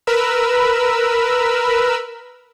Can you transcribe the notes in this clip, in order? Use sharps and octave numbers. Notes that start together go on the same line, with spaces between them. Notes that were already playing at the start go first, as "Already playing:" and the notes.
A#4 B4 B5 E6